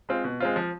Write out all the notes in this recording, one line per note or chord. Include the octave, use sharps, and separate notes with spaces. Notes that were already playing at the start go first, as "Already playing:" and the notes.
G#3 C4 F4
B2
G#3 C4 F4
F3